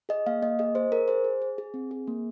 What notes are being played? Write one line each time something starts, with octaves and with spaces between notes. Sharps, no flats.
G#4 D#5
A#3 F5
A#3 D#5
G#4 D#5
G#4 C5
G#4 A#4
G#4 C5
G#4
G#4
G#4
C4
G#4
A#3